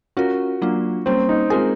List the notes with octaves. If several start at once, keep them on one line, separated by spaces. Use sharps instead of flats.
C#4 F4 F#4 A#4
F#3 A#3 D4 F4
G3 A#3 C4 C#4
D#4
G#3 C4 F4 G#4 A#4